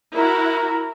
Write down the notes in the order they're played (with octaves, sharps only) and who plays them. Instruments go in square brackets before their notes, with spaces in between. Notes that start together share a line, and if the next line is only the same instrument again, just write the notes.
[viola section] E4 F#4 [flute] A#4